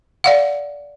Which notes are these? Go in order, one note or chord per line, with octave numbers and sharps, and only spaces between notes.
D5 F5 F#5